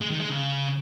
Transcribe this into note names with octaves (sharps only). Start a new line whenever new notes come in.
G#3
D#3
G#3
C#3